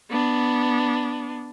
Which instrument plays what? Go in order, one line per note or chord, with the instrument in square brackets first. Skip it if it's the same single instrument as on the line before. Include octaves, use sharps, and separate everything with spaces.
[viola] B3 D4